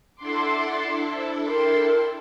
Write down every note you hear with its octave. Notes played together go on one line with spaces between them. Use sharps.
D4 E4 A4 F#5 C6 D6
C5
A#4 G5 C6